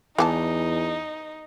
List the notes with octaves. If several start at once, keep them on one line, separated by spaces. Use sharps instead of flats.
E2 E3 D#4 G#4 A5